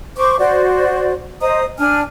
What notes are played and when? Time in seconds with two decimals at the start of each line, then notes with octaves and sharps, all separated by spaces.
0.17 C5 C#6 D6
0.39 F#4 C5 D5
1.41 C5 D#5 A#5 D#6
1.78 D4 G#5 F6